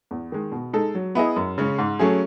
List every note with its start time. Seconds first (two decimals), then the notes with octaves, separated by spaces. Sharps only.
0.11 E2
0.32 D#3 G#3
0.52 B2
0.73 G#3 D#4 A4
0.95 F#3
1.15 B3 E4 G#4 D#5
1.36 F#2
1.58 C#3 G#3 C#4
1.78 G#2
1.99 F#3 A3 C#4 G#4